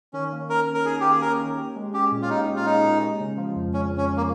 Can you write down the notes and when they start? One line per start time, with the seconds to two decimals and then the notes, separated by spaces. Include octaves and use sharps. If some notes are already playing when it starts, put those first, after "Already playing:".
0.13 D#3 C#4
0.32 A#3
0.49 C#4 A#4
0.67 D#3
0.74 A#4
0.85 D#3 G#4
1.00 A#3 G4
1.11 G#4
1.22 C#4 A#4
1.39 D#3
1.57 G4
1.76 G#3
1.93 C#4 G4
2.12 A#2
2.22 F4
2.30 D#4 G4
2.48 G#3
2.56 F4
2.66 C#4 D#4
2.84 A#2
3.02 G#3
3.20 C#3
3.37 F3
3.56 F2
3.74 G#3 C#4
3.92 C#3
3.98 C#4
4.10 F3
4.17 A#3